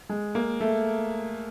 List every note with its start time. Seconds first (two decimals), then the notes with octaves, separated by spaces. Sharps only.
0.09 G#3
0.35 A#3
0.60 A3